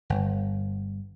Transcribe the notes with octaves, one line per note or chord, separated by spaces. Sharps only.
G1